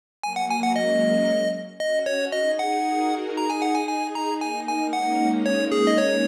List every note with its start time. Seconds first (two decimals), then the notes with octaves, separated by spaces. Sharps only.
0.23 F#3 A#3 G#5
0.36 F#5
0.50 G#5
0.63 F#5
0.76 G#3 C#4 D#5
1.80 C#4 F#4 D#5
2.06 C#5
2.32 D#4 G#4 D#5
2.59 F#5
2.84 F#4 A#4
3.37 D#4 G#4 A#5
3.50 G#5
3.62 F#5
3.75 G#5
3.89 D#4 G#4 G#5
4.15 A#5
4.41 A#3 D#4 G#5
4.68 G#5
4.93 G#3 C#4 F#5
5.46 C#5
5.72 G#4
5.87 D#5
5.98 C#5